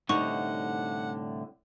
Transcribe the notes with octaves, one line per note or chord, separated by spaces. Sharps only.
C2 A2 D3 D#4 F#5 C#6